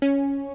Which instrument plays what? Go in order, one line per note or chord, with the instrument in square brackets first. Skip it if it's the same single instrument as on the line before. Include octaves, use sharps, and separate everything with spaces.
[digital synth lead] C#4